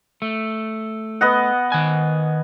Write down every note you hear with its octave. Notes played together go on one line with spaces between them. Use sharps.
A3
B3 D#5 F#5
D#3 G#5